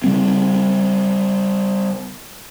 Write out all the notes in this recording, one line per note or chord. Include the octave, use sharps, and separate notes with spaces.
C#3 G3 C4